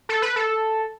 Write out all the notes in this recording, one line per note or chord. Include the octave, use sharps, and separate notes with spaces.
A4
B4
A4